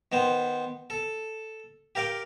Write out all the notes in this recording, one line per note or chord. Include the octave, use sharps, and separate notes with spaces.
D#3 B3 C5
A4
G4 A#4 F5 G5